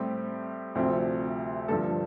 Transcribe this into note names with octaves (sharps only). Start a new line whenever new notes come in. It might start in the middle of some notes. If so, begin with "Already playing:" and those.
Already playing: A2 G3 C4 G4
D2 C3 F3 C4
G2 D3 F3 A4